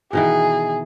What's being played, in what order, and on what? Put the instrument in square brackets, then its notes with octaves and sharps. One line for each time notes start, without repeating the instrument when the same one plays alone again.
[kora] B2 D#3 E3 [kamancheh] G#4